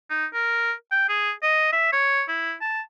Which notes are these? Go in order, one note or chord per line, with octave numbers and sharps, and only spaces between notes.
D#4
A#4
G5
G#4
D#5
E5
C#5
E4
A5